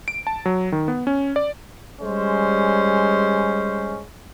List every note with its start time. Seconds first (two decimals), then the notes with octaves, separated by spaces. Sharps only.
0.08 D7
0.27 A5
0.46 F#3
0.72 D#3
0.88 B3
1.07 C#4
1.36 D5
2.02 G3 G#3 C#4 C5